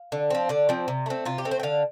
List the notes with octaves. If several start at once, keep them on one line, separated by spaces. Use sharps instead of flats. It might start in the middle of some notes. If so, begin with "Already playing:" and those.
Already playing: F5
D3
F3 C4
D3 D5
F3 C4
C3
A3 C4
C3 F4
G4
A3 C4
C5
G5
D3 F5